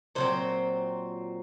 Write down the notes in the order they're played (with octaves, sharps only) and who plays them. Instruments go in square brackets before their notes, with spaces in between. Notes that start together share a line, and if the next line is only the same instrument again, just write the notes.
[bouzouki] A#2 F#3 C4 C5